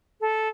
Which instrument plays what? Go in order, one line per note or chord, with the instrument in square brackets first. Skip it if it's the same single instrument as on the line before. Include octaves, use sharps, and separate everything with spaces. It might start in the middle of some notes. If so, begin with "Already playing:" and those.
[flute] A4